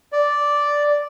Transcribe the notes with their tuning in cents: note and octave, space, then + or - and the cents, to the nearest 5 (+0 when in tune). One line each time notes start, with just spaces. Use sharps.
D5 -5